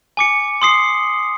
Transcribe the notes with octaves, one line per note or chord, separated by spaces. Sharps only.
G#5 D6 C#7
C6 D#6 C7